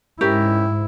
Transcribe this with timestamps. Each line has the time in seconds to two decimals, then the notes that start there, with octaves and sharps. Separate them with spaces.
0.21 G#2 C#4 E4 G4 A#4